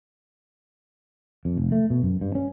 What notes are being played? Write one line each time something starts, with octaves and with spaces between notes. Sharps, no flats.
F2
F1
A3
B2
F#2
G2
C#4